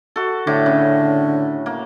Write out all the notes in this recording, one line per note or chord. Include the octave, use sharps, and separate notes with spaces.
F#4 A4
A2 D3 D6
C#3
A#3